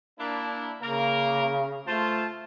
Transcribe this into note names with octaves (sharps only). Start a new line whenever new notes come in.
A#3 D4 E4
C#3 A#3 A#4
A3 F4 C5 A5